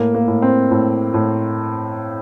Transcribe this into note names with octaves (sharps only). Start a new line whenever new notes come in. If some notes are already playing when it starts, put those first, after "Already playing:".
Already playing: A2 A#3
A#3
A2
C4
A2
A2